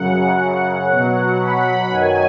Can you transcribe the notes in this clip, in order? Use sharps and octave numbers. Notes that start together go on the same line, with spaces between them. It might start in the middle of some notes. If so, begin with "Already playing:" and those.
Already playing: F#2 C#3 F#3 F#5
B2 F#3
B5
F#2 D#3 F#3 G#5